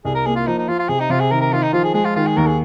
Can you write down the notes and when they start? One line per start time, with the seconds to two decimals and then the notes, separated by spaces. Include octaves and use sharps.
0.05 C2 G#4
0.15 A#4
0.26 A#3 G#4
0.36 F4
0.47 F3 D#4
0.58 D#4
0.68 F3 F4
0.79 F4
0.89 C3 G#4
1.00 D#4
1.10 C3 F4
1.20 G#4
1.31 D#3 A#4
1.41 A#4
1.52 D#3 F4
1.63 D#4
1.73 F3 F4
1.84 G#4
1.94 G#3 G#4
2.05 F4
2.16 D#3 F4
2.27 G#4
2.37 D#2 A#4
2.47 G#4